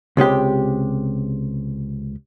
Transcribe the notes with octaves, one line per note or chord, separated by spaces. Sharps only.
C#2 C3 G#3 G4